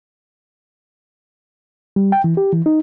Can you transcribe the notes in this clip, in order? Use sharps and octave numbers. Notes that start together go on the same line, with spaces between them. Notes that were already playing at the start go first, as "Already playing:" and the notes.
G3
G5
E3
G4
E3
D#4